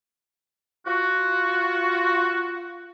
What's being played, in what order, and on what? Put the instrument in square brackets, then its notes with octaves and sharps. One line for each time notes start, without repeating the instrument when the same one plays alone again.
[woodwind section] F4 F#4